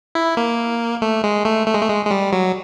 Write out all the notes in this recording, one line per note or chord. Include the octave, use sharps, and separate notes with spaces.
E4
A#3
A3
G#3
A3
A3
G#3
A3
G#3
G#3
G3
F#3